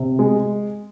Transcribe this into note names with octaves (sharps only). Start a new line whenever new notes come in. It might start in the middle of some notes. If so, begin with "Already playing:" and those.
Already playing: C3
G#3